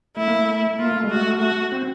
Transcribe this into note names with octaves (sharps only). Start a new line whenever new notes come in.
A3 E4
A#3
A3
A#3 F4
A3
G#3
F#4
A3
A3 F#4
C4